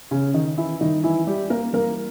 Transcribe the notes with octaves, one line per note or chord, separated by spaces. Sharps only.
C#3 C#4
D#3 D#4
E3 E4
G2 D#3 E3 D#4
E3 E4
G3 G4
A#3 A#4
G2 E3 A#3 A#4